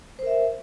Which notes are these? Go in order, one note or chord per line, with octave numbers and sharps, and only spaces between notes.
A#4 C5 E5